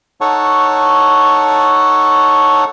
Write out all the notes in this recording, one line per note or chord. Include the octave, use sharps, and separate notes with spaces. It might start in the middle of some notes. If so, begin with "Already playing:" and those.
D#4 A4 C#5 F#5 A5 C#6